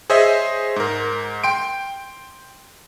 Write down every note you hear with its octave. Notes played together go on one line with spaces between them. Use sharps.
G#4 C5 C#5 D#5 E5
G#2 A#4
G5 C6 D7